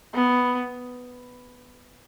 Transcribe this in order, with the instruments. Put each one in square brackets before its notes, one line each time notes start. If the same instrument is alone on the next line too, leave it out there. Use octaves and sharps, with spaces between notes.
[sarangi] B3